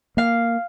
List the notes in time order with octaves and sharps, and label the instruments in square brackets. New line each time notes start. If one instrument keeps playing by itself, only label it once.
[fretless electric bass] A#3 [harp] F5